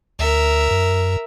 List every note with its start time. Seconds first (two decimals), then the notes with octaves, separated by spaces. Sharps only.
0.19 D2 A#4 E5
0.71 F#2